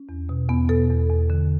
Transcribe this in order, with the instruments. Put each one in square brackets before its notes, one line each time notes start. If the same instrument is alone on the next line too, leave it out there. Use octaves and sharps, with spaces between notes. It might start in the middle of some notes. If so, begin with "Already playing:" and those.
Already playing: [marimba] C#4
E2
B2
E2 B3
B2 A4
E2
E2
D3